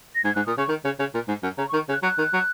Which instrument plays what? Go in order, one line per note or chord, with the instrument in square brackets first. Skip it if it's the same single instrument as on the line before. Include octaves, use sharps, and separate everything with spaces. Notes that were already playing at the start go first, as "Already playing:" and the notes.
[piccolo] A#6
[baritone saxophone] G#2 [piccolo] G#6
[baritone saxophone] G#2 [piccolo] F#6
[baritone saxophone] A#2 [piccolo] D#6
[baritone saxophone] C#3 [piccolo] C#6
[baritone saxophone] D#3
C#3
C#3
A#2
G#2
F#2
[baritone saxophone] C#3 [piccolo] A#5
[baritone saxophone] D#3 [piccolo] C#6
[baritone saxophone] C#3
[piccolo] F#6
[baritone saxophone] F#3 [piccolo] F#6
[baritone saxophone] D#3
F#3